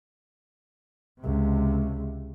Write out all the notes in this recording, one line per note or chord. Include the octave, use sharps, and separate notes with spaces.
C#2 C3